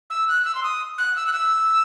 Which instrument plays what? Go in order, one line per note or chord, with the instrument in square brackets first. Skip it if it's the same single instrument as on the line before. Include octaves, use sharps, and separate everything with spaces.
[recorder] E6
F#6
E6
C6
D#6
F#6
E6
F#6
E6